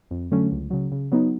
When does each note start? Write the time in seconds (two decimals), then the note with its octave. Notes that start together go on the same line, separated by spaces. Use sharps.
0.11 F2
0.31 D3 F#3 A3 C#4
0.52 C#2
0.70 C#3 F#3
0.92 C#3
1.12 F#3 B3 D#4